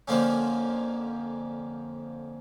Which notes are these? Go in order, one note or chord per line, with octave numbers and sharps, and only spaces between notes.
F2 D3 F3 A#3 C#4